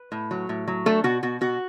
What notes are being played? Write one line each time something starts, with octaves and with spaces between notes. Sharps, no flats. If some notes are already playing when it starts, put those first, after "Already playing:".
Already playing: B4
A2
F#3
A2
F#3
A3 D4 A4
B2 F#4
B2 F#4
B2 F#4